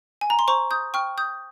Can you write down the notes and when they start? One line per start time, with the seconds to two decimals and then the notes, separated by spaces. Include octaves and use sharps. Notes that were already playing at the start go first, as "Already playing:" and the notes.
0.21 G#5
0.30 A#5
0.39 C6
0.48 C5 A#5 C#6
0.71 D#6 G6
0.94 G5 C#6 F6
1.18 D#6 G6